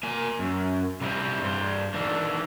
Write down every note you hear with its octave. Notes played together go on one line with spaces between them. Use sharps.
A#3 G#5
F#2
C3 G3 D#4 E4 C5 D#5
G2 C5
D#3 E3 A#3 D4